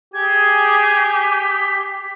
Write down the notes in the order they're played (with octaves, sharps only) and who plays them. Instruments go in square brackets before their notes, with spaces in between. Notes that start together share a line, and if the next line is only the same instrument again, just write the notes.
[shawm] G4 [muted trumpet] G#4 [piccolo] G#6
[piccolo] B6